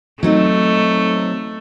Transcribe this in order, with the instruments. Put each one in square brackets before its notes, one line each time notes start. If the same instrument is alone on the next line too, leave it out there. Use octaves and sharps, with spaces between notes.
[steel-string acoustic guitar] F#3 C4 D#4 [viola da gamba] A3